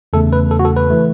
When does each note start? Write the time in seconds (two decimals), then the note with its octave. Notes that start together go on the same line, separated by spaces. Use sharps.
0.13 E2 C#3 A3 A4
0.33 B4
0.51 A4
0.59 F#4
0.65 A4
0.77 B4
0.90 E3 A3